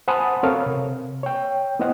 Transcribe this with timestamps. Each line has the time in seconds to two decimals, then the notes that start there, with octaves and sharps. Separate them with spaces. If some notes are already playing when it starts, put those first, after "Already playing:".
0.08 C5 F#5 G#5 A5 B5 D#6
0.43 C4 A4 A#4 C#5 F5
0.66 C3
1.23 C#5 G5
1.79 B3 E4 C5 D#5 F#5